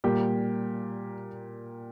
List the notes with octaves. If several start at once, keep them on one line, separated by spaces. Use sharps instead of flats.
A#2 G3 A#3 G4